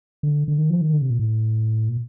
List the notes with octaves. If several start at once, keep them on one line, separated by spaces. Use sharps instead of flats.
D3
D3
D#3
F3
D#3
D3
C3
A#2
A2
A#2